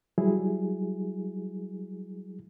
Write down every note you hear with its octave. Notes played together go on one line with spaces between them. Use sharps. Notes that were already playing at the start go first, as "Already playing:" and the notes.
F#3 G3 E4 G#4